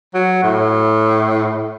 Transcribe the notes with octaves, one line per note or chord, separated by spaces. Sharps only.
F#3
A2